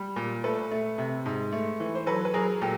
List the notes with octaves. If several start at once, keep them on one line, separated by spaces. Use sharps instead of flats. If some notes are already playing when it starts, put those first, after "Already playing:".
Already playing: G3
A#2
A3 A4 B4
A3
C3
G#2
A3
E3
C5
F#3 A4 B4
B4
F#3 G#4 A#4
A#2 G4 A4